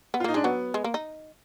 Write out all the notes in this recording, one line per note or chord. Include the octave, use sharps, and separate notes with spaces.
B3
F4
A#3 D#4
G#3 D4
F#3 B3
G#3
A#3
D#4